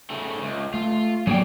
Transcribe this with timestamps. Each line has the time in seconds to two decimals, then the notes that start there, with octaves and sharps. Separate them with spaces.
0.10 C#3 A3
0.42 C#2
0.74 A3 F4
1.27 A2 F#3 A#3 B3 G#4 D5 G5